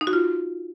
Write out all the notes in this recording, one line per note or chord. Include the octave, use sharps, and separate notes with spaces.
D#4
F#4
F4